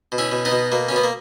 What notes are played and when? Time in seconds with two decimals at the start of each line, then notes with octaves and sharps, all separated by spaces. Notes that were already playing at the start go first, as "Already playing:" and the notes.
0.12 B2
0.18 C#4 E4
0.32 B2
0.45 B3 D#4
0.52 B2
0.72 B2 A#3
0.89 C#4
0.92 B2 B3
1.04 A#3